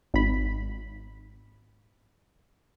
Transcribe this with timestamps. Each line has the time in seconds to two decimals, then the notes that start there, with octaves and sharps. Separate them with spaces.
0.14 G#1 B5